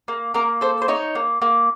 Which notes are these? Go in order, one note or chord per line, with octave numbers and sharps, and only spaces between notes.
A#3
A#3 A#4
A4 C5
C5
D#4 C#5
A#3
A#3